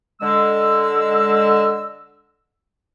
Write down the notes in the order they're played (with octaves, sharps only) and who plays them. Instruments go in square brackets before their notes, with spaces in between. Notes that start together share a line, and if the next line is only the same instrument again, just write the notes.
[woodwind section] D3 G#3 E6